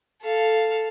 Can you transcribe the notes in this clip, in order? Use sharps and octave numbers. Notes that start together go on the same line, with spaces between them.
A4 F5